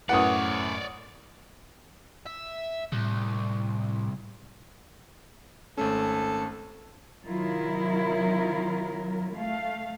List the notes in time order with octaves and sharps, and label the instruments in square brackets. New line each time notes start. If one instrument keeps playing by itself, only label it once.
[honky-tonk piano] F#2 A2 B4 [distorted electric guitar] C#5 D5 [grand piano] F#5 D#6
[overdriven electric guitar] E5
[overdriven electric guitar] C2 [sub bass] A2
[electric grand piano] G#1 A3 C#4 [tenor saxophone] A4
[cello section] C3 D#3 F#3 E4 F4 A#4
A3 F5